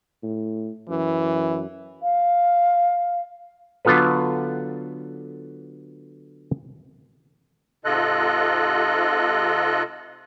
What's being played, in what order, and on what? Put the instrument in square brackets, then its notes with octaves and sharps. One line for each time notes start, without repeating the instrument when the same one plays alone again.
[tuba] A2
[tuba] F#2 [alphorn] E3
[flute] F5
[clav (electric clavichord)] D3 F#3 B3 F4 A4 B4
[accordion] G#2 C3 F4 A4 D#5 F#6